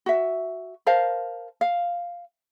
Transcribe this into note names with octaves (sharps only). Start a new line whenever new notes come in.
F#4 E5
A#4 C5 F5 A5
F5